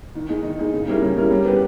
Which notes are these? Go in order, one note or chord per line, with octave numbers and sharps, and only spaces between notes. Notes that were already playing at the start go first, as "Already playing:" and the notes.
D#3
G#3 D#4
D#3
G#3 D#4
C#3
G3 C#4 E4 A#4
C#3
G3 C#4 E4 A#4
G3
B3 G4 B4